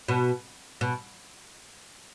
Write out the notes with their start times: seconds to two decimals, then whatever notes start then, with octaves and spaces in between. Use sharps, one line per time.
0.08 B2
0.81 B2